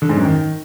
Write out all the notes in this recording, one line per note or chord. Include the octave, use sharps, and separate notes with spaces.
D3
G#2
F#2
D#3